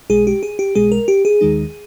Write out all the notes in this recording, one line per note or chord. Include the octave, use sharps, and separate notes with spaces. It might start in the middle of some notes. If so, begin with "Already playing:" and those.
B1 B2 G#3 G#4
G4
G#4
G4
B1 B2 G#3 G#4
A#4
G4
G#4
D#2 D#3 G#3 D#4